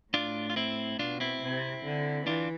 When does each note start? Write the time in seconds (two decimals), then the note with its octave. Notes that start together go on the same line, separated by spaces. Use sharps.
0.13 A2 D4 F4
0.50 F4
0.56 C4 E4
0.99 B2 D4 F4
1.20 C4 E4
1.42 C3
1.84 D3
2.27 E3 D4 F4